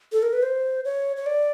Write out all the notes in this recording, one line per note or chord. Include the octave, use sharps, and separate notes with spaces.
A4
A#4
B4
C5
C#5
C#5
D5